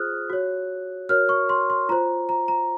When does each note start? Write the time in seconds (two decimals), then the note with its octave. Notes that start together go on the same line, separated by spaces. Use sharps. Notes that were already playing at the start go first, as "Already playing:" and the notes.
Already playing: F4 G#4 C5 D#6 F6 F#6
0.30 F#4 C#5
1.09 F#4 A#4 C#5 F6
1.29 C#6
1.49 C6
1.70 C6
1.89 F4 C5 A#5
2.29 A#5
2.48 A#5